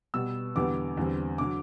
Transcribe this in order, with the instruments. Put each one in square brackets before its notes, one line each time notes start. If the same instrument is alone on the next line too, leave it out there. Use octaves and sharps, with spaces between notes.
[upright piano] B2 G3 B3 E6
E2 D3 G3 B3 D6
E2 D3 G3 C4
D3 F#3 D6